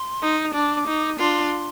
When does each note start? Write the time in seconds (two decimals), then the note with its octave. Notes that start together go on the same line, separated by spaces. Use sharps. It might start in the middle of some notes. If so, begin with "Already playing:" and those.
Already playing: C6
0.21 D#4
0.53 D4 D6
0.86 D#4
1.19 D4 F4 C6